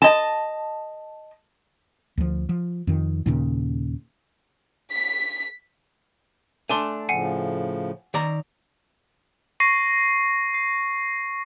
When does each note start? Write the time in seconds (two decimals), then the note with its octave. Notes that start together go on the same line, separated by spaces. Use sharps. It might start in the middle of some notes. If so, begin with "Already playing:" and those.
0.02 D#5 A5
2.17 D2 F3
2.49 F3
2.87 F2 D#3
3.26 D#2 A#2 C#3
4.91 B6
6.69 A3 D4 G#5 C6
7.09 A2 C#3 F3 F#5 G#5 C7
8.14 D#3 D5 A#5
9.60 C#6 A#6 C7
10.54 C7